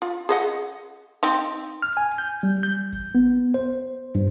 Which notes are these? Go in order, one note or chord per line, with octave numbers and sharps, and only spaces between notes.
F4
G#4 D#5 F#5
C4 D#4
F6
G#5
G6
G3
G6
A1
B3
C5
G2